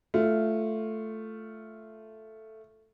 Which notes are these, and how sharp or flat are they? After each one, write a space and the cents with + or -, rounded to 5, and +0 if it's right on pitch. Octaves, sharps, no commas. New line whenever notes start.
A3 +0 F4 -5